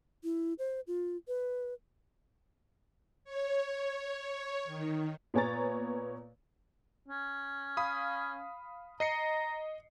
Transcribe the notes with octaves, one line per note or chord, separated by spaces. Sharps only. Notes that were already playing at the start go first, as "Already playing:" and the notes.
E4
C5
F4
B4
C#5
C#5
D#3
A#2 B3 C#5 G#5 A#5 A6
C#4
F5 B5 D#6
D#5 A#5 C7 C#7